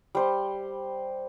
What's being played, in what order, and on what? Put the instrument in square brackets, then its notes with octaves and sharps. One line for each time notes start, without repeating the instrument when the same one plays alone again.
[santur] G3 C5 C6